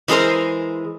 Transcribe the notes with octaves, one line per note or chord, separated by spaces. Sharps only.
E3 G#3 G#4 A#4 C5